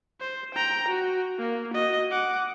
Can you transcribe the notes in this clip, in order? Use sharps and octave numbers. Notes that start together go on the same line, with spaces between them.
C5
G5 A#5
F#4
A#3
F#4 D#5
F#5 D6